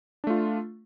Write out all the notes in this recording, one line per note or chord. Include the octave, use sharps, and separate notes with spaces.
A3 D4 F4